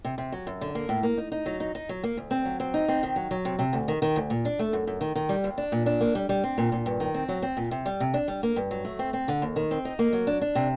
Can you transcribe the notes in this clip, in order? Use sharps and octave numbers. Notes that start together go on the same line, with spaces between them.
C3
C3
F#3
F#2
D3
A#3
A2
A#3
D#4
D#4
F#3
D#4
D#4
F#3
A#3
D2
C4
F#3
C4
D#4
C4
D#3
F#3
F#3
C3
C3
D2
D#3
D#3
D2
A#2
D4
A3
F#2
F#2
D#3
D#3
G3
D#2
D4
A#2
D4
A#3
G3
G3
C4
A#2
A#2
G2
D#3
C4
F#3
C4
A#2
C3
G3
C3
D4
G3
A#3
G2
F#3
A3
C4
C4
D3
D#2
D#3
C4
D#4
A#3
F#3
D4
D4
C3